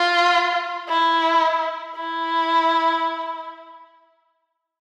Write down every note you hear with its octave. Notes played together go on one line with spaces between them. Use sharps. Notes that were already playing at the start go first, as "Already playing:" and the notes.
Already playing: F4
E4
E4